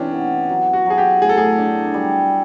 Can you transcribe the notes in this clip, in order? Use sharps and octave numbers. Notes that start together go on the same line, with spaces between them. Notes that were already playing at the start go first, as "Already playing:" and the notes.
Already playing: C3 E3 C#4 D4
B3
F#3
F#4
F#3 G#4
G4
A2 G#4
A4
G#4
D4
G3